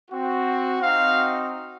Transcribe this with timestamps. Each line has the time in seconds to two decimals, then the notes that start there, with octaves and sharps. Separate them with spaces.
0.10 C4 F#4
0.81 C4 D#4 F#4 F5